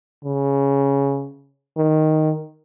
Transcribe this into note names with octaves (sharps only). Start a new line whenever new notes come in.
C#3
D#3